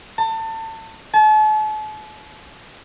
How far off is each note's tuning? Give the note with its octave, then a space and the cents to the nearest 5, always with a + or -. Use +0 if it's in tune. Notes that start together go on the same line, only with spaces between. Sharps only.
A5 +30
A5 -40